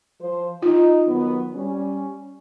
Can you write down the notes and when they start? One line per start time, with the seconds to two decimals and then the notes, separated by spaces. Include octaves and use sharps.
0.20 F3 C5
0.62 D#4 F4
1.07 D#3 F#3 B3
1.53 G3 C#4